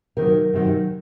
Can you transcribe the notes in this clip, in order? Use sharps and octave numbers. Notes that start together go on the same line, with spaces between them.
C3 D#3 F#3 A#4
C3 D#3 F#3